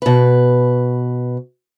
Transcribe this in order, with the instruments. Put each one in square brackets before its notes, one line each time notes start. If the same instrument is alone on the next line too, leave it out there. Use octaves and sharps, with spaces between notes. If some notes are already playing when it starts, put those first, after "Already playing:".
[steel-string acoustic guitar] B2 B4